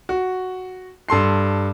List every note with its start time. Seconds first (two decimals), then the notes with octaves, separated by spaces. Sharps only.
0.09 F#4
1.09 G2 A4 C6 C7